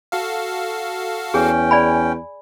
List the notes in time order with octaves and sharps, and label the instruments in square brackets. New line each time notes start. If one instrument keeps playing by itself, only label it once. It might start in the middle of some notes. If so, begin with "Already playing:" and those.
[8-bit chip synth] F#4 A4 F5
[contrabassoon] E2 [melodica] C#4 G5 [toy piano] G#4
[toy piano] D5 G#5 B5